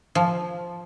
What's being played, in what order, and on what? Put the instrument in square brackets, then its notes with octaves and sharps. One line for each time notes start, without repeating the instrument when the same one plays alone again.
[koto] F3